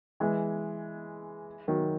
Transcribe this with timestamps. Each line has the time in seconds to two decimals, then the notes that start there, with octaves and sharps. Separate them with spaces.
0.20 E3 G#3
1.68 D#3 F#3